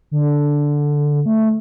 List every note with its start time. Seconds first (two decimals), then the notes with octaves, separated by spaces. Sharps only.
0.11 D3
1.26 A3